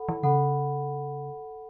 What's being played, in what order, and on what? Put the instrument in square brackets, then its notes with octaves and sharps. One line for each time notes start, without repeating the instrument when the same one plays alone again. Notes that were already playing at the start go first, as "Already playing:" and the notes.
Already playing: [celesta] A4 F#5 B5
[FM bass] E3
[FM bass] C#3 [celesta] A4 F#5 B5